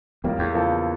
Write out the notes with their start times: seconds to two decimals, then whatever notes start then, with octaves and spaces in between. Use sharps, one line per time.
0.24 A1 F2 A2 G3 A#3
0.39 E2
0.54 C#3 F3 A#3 E4 A4